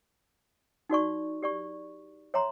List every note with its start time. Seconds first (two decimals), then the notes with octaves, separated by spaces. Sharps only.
0.90 D#4 F#4 D5 C#6
1.43 G4 D5 C#6
2.34 C#5 E5 A#5 C6